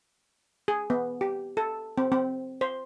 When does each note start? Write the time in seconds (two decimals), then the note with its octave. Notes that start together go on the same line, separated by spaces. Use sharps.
0.68 G#4
0.90 B3
1.21 G4
1.57 A4
1.98 C4
2.12 C4
2.61 C5